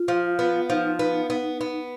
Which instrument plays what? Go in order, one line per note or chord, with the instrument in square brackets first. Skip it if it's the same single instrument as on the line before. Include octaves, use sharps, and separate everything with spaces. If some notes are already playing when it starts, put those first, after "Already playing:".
Already playing: [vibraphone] F4
[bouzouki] F3
B3
[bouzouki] F3 [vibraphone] D#4
[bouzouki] B3
B3
B3